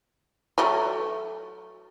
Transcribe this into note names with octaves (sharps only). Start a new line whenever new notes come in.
F#3 A3